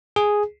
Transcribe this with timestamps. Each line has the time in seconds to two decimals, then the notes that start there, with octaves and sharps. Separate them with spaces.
0.16 G#4